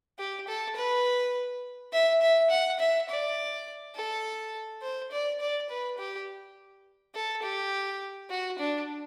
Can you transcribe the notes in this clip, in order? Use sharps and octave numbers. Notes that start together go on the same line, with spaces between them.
G4
A4
B4
E5
E5
F#5
E5
D5
A4
C5
D5
D5
B4
G4
A4
G4
F#4
D4